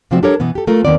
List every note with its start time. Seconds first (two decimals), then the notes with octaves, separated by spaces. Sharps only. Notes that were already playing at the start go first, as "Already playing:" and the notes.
0.11 C3 F3 G3 A3 C4 F#4
0.23 D4 G4 A4 A#4 C#5
0.40 B2 E3 B3
0.55 G4 A4
0.67 A3 F4 A4 A#4
0.85 D#2 B2 D#3 B3 C4 D5